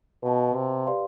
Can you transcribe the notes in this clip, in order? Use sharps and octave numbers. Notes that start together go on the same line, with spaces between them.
B2 B4 F5 A5
C3
G4 B4 D5 F5 C6